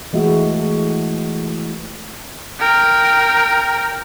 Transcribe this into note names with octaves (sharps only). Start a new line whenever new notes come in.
E3 G#3 A3 F#4
A#4 G5